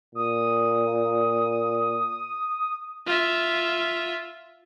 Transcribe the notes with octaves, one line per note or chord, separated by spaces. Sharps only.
A#2 D#6
F4 E5